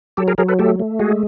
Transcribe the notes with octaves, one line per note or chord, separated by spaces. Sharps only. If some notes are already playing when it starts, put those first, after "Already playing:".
F#3 G4 A4
G#4 A#4
F#3 G#4 A#4
A4 B4
A3 G4 A4
A3
G#3 F#4 G#4